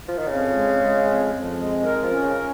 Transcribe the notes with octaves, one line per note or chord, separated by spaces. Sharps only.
F3
D#3
F2 C#3
G#3
G#3
F2
F2
G#3
D#3 A#4
F3
C#4
C#3
C#4